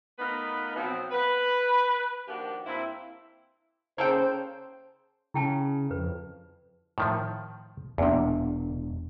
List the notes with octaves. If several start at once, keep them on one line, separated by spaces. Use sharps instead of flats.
A3 B3 D#4 F4 A#4 B4
B2 F3 F#3 B3 C4
B4
D#3 F3 A#3 D4 F#4 G4
G2 A#3 C4 E4
C#3 A#3 A4 C5 G5
C#3 E4 G5 A5
F2 B4
A2 D#3 F3
E1 E2 A#2 B3 D4